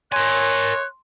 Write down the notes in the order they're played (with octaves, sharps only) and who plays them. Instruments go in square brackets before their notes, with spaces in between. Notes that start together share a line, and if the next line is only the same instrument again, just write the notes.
[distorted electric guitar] A#4 G#5 [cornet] C#5 [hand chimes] C6 [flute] F#6